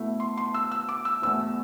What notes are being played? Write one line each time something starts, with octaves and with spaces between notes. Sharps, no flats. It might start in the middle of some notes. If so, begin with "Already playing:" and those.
Already playing: B2 A3 E4
C6
C6
E6
E6
D6
E6
E2 B2 A3 E6